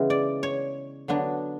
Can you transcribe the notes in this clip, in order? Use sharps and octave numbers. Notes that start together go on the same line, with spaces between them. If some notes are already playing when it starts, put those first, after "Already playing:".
Already playing: C#3 E3 G#3 B3
D5
C#5
D3 F#3 B3 D4